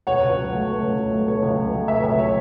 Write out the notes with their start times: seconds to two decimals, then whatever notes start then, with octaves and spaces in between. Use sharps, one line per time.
0.07 B2 C#5 F#5
0.22 C#2
0.37 F#3
0.52 A3
0.68 B2
0.82 C#2
0.98 F#3
1.12 A3
1.28 B2 C#5
1.43 C#2
1.58 F#3
1.74 A3
1.88 B2 E5
2.03 C#2 E5
2.18 F#3 C#5